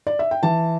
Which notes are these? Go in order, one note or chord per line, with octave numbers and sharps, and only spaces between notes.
D5
E5
G5
E3 A5